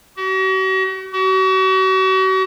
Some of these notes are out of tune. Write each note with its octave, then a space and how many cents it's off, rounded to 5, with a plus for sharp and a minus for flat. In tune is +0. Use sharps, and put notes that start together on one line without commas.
F#4 +45
F#4 +40